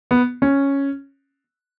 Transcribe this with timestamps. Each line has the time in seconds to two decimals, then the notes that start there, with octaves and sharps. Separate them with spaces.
0.11 B3
0.42 C#4